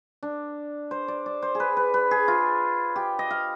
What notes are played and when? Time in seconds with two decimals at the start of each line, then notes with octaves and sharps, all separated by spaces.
0.23 D4
0.91 C5
1.08 D5
1.26 D5
1.42 C5
1.55 G#4
1.60 B4
1.77 B4
1.94 B4
2.11 G#4
2.28 F4
2.96 G4
3.19 D#5
3.31 F5